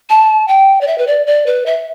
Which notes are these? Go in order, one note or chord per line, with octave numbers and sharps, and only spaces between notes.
A5
G5
D5
E5
B4
D5
D5
B4
E5